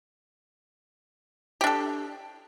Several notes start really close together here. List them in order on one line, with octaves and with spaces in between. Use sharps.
G4 D4 A4